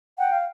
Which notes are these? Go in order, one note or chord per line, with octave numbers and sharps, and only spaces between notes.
F#5 G5
F5